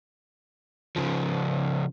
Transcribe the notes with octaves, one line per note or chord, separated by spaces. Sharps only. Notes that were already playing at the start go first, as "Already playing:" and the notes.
C#3 F3